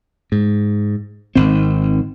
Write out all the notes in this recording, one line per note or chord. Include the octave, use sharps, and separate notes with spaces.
G#2
G#1 D#3 C4